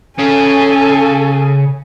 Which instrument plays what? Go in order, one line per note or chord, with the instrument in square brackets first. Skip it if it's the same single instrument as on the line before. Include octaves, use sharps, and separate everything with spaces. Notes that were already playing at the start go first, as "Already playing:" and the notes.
[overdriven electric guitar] C#3 [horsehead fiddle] A4 G#5